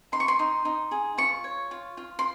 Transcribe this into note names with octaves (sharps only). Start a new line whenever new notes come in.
D#4 C6
C#6
C6
D#4
D#4
G#4
F4 C#6
C#5
F4
F4
C6